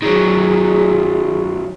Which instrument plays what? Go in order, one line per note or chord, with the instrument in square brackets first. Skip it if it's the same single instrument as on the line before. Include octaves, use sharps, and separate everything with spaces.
[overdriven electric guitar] D#3 F#3 [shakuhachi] G#4